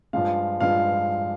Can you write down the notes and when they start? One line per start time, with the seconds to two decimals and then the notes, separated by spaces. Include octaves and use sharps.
0.13 G2 F3 G#3 F5
0.60 G2 F3 G#3 F5